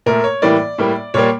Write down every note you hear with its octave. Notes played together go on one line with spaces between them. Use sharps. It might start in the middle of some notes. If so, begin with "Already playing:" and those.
A#2 A3 A#4
C#5
A2 E3 G3 A#3 D5
A2 G3 A#3
A#2 G3 A#3 C#5